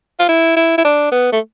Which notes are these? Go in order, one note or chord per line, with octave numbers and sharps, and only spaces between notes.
F4
E4
E4
E4
D4
B3
A3